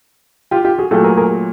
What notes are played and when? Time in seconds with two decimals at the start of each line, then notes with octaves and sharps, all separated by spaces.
0.51 F4 G4
0.64 F4 G4
0.78 F#4 G#4
0.91 A#2 F#3 A3 G4 A4
1.04 G#4 A#4
1.17 G#4 A#4